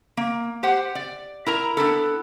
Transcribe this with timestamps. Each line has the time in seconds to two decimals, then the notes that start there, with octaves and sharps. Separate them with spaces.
0.17 A#3
0.63 G4 C5 F#5
0.95 D5
1.46 E4 A#4 A#5
1.77 B3 D4 E4 A4